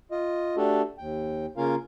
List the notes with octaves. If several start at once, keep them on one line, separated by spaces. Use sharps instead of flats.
F4 D#5
A3 D4 F#4 G4 A4
D#2 G5
C#3 A#3 C#4 F4 A#4 F5